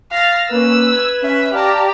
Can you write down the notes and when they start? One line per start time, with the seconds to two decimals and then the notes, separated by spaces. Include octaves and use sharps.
0.12 F5 A6 A#6
0.51 A#3 C#4 B4 E6
0.92 G#6 E7
1.22 C#4 E5
1.53 G4 D5 F5 A5 A#5